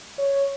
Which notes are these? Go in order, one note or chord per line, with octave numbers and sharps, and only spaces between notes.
C#5